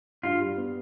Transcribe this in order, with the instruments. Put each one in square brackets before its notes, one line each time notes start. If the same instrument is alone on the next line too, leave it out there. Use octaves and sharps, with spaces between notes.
[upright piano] G2 [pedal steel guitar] F4
[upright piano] G3
B3